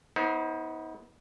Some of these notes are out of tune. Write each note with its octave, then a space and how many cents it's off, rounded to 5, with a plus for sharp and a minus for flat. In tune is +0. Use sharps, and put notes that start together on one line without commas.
B3 +0 D#4 +40 C5 +25